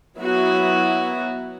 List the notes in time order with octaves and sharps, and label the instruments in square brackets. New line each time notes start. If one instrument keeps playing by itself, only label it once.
[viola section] F#3 B3 E4 F#4